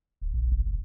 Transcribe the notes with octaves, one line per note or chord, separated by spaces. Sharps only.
D1
A#1
F1
F1